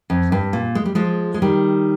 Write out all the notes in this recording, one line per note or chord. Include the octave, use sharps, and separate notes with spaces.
F2
G2
A#2
G#3
G3
F3 G#3
G#3
D#3 G3